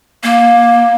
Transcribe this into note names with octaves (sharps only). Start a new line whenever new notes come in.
A#3